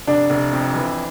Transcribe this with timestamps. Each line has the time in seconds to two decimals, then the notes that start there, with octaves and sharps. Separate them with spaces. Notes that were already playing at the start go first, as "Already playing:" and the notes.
0.07 F1 D4
0.30 F1
0.53 F2
0.75 E3